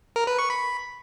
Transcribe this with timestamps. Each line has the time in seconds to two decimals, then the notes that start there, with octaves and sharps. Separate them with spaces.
0.16 A#4
0.27 B4
0.39 C#6
0.50 B5